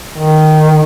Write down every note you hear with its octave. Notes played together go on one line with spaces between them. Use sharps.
D#3